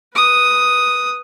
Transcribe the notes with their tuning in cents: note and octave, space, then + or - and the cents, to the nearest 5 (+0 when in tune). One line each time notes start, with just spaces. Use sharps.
B4 +0 D#6 +0